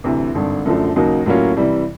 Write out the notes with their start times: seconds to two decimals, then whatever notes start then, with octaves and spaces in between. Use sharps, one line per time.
0.04 D2 C3 E3
0.35 G#1 G2 D3
0.65 F#2 D3 F3 A3
0.96 D#2 C#3 F#3 A#3 D#4
1.26 A2 F#3 A#3 C#4 F4
1.57 C3 E3 G3